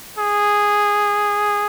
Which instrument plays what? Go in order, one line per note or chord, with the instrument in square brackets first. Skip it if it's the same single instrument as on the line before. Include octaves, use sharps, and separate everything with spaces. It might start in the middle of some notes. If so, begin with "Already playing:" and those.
[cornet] G#4